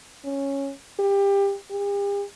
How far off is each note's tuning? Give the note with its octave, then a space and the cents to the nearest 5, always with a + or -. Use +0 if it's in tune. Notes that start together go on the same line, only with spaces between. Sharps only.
C#4 -5
G4 +20
G4 +45